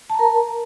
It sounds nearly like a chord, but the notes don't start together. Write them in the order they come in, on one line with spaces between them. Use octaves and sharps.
A5 A#5 A#4